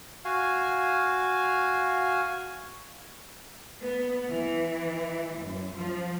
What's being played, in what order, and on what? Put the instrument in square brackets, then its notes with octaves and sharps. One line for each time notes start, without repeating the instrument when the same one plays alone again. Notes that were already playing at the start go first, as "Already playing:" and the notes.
[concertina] F#4 F5 G#5
[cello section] B3
E3
F#2
F3